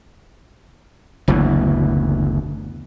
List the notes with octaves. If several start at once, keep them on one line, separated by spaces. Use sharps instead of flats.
F#1 D2 B2 E3